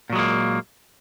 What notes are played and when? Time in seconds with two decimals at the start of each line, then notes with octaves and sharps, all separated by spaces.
0.10 A#2
0.13 F#3
0.16 G#3
0.18 A#3